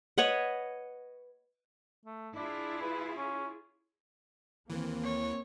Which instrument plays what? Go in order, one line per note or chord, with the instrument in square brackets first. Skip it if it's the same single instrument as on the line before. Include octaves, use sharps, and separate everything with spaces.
[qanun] B4 C#5 D#5 F#5
[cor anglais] A3
[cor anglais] D4 [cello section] E4 F4 G#4
[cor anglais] B4
C#4
[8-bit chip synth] D#2 E3 [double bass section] A#3 C4
[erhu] C#5